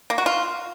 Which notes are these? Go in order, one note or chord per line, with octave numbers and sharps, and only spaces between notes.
A#3
F#4
F4